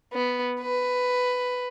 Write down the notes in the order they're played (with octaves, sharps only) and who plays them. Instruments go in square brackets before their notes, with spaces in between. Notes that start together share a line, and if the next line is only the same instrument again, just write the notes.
[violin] B3
B4